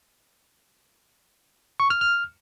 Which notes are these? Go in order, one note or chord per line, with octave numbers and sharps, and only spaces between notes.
C#6
F6
F6